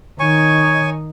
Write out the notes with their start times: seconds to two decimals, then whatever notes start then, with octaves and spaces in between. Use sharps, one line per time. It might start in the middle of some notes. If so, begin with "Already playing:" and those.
0.19 D#3 D#4 C#5 G#5 C#6